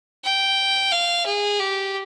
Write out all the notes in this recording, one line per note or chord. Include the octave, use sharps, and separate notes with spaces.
G5
F5
G#4
G4